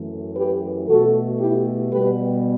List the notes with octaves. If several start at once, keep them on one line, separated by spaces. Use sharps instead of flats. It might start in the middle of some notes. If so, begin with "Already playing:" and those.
Already playing: F#2 E3 A3
G4 B4
B2 A3 F#4 A4
E4 G4
B2 G3 B3 G4 B4